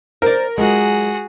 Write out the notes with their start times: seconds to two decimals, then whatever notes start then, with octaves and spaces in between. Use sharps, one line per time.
0.22 A#4 C5 D5
0.58 F#3 G#3 F4 F#4 G#4